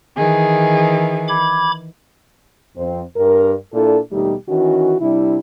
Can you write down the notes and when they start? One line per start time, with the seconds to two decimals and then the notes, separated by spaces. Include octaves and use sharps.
0.17 D#3 E3 G#4
1.28 B5 D6 G#6
2.76 F2 C4
3.16 G2 A#4
3.73 A#2 D4 E4 A4
4.11 D#2 B2 G3 A3 D#4 G4
4.48 D#3 E3 C#4 F#4
5.00 C3 G3 D4 E4